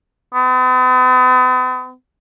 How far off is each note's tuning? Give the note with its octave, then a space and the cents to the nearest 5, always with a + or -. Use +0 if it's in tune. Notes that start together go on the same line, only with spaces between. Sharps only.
B3 +45